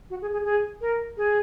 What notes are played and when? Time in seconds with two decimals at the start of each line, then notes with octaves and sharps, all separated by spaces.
0.10 F#4
0.21 G#4
0.33 G#4
0.45 G#4
0.81 A#4
1.17 G#4